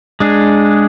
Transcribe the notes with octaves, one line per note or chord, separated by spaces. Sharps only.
G#3 D4 G#4